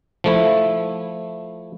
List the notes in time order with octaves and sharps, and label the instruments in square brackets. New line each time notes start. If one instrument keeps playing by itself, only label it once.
[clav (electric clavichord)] F3 A3 E4